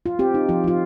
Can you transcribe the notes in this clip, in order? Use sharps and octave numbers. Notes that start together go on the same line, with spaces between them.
F4
C4 G4
D#4
F3 F4
F3 F4